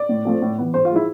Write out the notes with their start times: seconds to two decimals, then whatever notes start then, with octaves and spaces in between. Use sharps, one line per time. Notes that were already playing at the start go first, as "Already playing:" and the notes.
Already playing: D5
0.09 A2
0.25 F3 A3 C4
0.42 A2
0.58 E3 B3
0.74 G#2 C5
0.85 F4
0.91 F3 G#3 E4